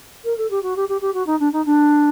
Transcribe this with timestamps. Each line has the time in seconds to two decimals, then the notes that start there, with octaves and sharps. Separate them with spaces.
0.25 A#4
0.38 A4
0.50 G4
0.63 F#4
0.76 G4
0.89 G4
1.01 G4
1.14 F#4
1.27 D#4
1.39 D4
1.53 D#4
1.66 D4